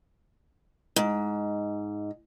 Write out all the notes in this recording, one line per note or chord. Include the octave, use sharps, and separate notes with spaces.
G#2